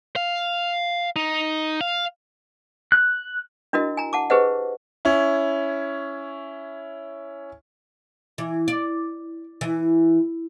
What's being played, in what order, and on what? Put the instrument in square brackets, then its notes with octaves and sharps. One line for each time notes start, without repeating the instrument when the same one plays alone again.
[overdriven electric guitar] F5
D#4
F5
[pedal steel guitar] F#6
[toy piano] D4 E4 F#4 A#4 D#5
G#5 A#5
F#5 A5 D6
G4 G#4 B4 C5 D#5 F#5
[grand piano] C#4 E4
[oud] E3
D5
E3